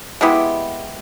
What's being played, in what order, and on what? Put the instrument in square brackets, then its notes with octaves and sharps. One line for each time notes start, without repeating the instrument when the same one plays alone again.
[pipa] G#3 B3 E4 G4